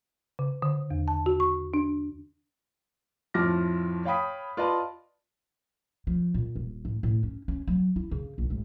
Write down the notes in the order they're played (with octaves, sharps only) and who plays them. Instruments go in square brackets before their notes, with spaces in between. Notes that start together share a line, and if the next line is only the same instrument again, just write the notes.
[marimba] C#3
D3
E2
A5
F#4
C#6
D4
[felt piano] F2 A2 F3 D6 F6 A#6
C#5 F5 G5 B5 D#6 B6
F4 B4 D5 D#5 A5 B5
[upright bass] F3
A#2
D#1
A2
A2
C#4
C#4
F#3
E4
C#3
A#1
G#1